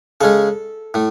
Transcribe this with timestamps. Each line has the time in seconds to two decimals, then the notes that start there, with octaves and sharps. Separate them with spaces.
0.21 C#3 G#3 C#4 A4
0.94 A2 A3